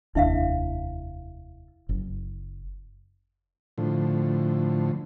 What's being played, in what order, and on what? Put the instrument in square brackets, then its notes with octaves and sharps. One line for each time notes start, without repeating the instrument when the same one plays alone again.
[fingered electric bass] F1 D#2 D4 [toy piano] E4 E5 F5
[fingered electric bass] F#1
[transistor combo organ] A2 D3 F3